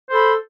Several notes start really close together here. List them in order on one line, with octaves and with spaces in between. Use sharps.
C5 A4 B5